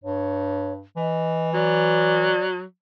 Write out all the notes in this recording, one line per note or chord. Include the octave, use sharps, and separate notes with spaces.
G2 C#5
E3 D#5
F#3 D5